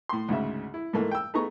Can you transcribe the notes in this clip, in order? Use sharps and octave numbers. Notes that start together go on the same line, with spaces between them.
A2 C6
D2 G#2 C#3 E5
E4
G#2 E3 A3 A#3
G5 E6
A3 B3 D#4 G#4 A#5 C#6